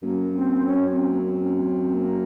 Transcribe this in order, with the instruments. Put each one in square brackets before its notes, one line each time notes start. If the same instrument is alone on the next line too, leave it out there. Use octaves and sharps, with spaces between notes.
[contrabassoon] F#2 [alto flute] A#3
[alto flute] C4
C#4
C4
A#3
C4
C#4
C4
A#3